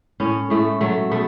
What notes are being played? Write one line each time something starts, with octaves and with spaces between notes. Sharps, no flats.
A2 C#4
A2 A3
F#3 A3
B2 A3